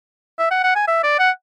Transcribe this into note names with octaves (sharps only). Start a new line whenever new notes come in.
E5
F#5
F#5
G#5
E5
D5
F#5